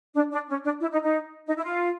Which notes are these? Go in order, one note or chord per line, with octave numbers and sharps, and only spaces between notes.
D4
D4
C#4
D4
E4
D#4
D#4
D#4
E4
F4